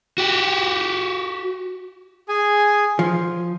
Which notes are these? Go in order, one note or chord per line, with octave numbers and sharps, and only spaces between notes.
F#4 G4
G#4 G#5
F3